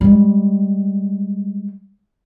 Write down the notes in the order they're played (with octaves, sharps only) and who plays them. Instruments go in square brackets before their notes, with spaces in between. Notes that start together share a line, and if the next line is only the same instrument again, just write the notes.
[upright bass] G3 G#3